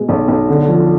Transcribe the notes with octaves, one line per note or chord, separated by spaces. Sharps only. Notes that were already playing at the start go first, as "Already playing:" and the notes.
Already playing: B2 G#3
B1
B1
D3
F3